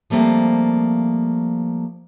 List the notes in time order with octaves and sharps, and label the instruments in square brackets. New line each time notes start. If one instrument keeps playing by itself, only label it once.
[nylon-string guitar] F3 G3 A3 A#3 C4